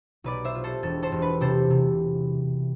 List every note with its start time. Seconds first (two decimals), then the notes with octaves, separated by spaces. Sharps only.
0.24 B1 B4 D5
0.45 C5 E5
0.55 F4
0.64 A4 C5
0.83 E1 A4
1.03 A4 C5
1.12 E1
1.22 B4
1.41 C3 A4 C5
1.70 C3